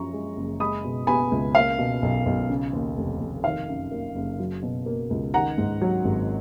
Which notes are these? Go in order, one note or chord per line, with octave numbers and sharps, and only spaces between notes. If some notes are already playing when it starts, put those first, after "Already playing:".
Already playing: F#2 F3 A#5 C#6
G#3
F#1
G#3 B5 D#6
B2
B3 G#5 B5
C#2
A#3 F5
B2
B1
B1
C#3
D#2
F1
F1
D#3 F5
F#2
A#3
F#1
F#3
B2
A#3
C#2
D#3 F#5 A#5
G#2
F#3
G#1